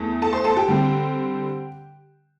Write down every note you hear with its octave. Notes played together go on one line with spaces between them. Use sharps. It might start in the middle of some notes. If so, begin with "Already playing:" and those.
Already playing: E2 E3 A3
A4 A5
C5 C6
A4 A5
G4 G5
D3 G3 C4